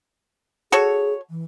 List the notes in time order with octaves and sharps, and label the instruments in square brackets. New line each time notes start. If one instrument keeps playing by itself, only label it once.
[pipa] F#4 A4 C#5 [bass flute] G#4
[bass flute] E3